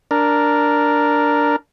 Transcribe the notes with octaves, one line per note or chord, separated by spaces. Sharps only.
D4 A#4